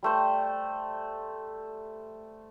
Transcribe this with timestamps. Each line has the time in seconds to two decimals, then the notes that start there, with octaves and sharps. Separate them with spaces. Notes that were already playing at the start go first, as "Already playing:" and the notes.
0.03 G3 A3 C5